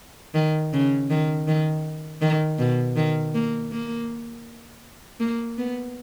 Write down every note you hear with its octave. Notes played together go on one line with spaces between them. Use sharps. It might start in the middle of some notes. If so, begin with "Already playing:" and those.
D#3
C#3
D#3
D#3
D#3
B2
D#3
A#3
A#3
A#3
B3